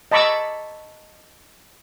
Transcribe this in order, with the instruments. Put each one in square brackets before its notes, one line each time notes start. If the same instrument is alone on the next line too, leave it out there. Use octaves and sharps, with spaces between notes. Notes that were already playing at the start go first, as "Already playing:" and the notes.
[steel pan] D#5 A5 B5 C#6 D6 E6